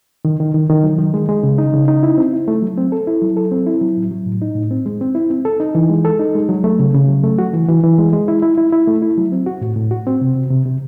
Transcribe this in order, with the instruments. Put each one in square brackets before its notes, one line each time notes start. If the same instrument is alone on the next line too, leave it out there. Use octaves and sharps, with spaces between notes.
[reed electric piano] D#3
D#3
D#3
D#3
F#3
D#3
G#3
G#3
C#3
D#4
C#3
D#4
E4
C4
E4
A3
F#3
C4
A4
E4
F#3
A4
C4
E4
F#3
A2
F#3
A2
D#4
A2
C4
G#3
C4
E4
C4
A4
D#4
E3
G#3
A4
D#4
G#3
F#3
A3
C#3
C#3
F#3
A3
F#4
E3
E3
E3
G#3
G#3
E4
E4
E4
E4
A3
E4
F#3
C4
F#4
A2
A2
F#4
C4
C3
C3
C3
C3